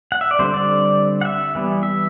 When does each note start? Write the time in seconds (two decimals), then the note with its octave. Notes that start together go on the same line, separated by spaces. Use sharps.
0.12 F#5
0.21 E5
0.31 D5
0.39 D3 G3 C4 C5
0.54 D5
1.21 F#5
1.25 E5
1.55 E3 G3 B3
1.83 E5